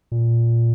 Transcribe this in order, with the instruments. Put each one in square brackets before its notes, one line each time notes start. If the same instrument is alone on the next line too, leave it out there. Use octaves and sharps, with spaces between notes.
[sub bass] A#2